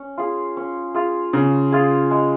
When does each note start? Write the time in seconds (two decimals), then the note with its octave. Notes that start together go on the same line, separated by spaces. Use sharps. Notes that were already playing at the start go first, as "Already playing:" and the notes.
Already playing: C#4
0.18 F4 G#4
0.57 C#4
0.94 F4 G#4
1.33 C#3 C#4
1.72 F4 G#4
2.11 G#3